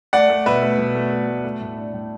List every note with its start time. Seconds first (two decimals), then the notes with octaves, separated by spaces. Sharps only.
0.13 A3 D5 F#5
0.29 A3
0.46 B2 B4 E5
0.62 A3
0.78 B2
0.95 A3
1.11 A3
1.27 A3
1.44 A3
1.61 A2
1.77 D4
1.93 A2